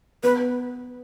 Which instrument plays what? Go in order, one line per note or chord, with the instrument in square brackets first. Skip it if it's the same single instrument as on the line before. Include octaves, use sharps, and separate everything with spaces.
[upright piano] B3 [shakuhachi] B4